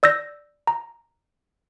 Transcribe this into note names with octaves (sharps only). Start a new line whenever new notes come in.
D5 E6 G6 A#6
A#5